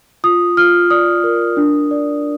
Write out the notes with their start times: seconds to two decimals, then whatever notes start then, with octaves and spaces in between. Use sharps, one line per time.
0.24 F4 D#6
0.57 F4 F6
0.90 D5 D#6
1.24 A#4
1.57 D4
1.91 D5